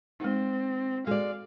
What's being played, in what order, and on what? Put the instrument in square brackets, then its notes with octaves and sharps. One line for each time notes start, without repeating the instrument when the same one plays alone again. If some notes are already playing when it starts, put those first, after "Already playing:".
[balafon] G#3 D#4 [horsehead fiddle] C4
[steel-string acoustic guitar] G#3 D5 [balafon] F#4 A4 [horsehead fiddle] F5